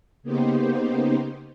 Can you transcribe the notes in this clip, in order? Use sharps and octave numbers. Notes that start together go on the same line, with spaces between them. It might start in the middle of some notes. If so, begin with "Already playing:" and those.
C#3 A#3 B3 D#4 G4 C5